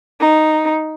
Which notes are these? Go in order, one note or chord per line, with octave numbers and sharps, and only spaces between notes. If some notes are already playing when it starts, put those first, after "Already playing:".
D#4